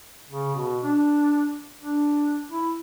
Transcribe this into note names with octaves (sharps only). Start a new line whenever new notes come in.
C#3
B2
D4
D4
E4